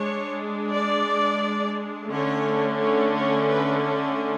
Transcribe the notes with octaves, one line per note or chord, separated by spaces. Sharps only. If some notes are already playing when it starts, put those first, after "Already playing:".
Already playing: G#3 D4 C#5
D5
D3 A3 C#4 C#5
C#5
C#5
B4
A4